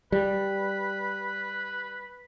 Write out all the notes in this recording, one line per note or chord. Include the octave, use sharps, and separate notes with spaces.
G3 B4